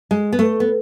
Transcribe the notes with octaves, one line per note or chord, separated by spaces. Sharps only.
G#3
B3
A3
B3